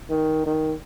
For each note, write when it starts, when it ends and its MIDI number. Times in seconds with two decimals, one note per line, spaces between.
0.10 0.43 51
0.46 0.73 51